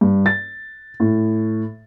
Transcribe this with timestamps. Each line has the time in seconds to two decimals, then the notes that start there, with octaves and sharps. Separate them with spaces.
0.01 G2
0.26 A6
1.00 A2